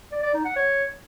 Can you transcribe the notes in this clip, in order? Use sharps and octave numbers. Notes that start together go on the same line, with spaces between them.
D5
D5
D#4
F#5
C#5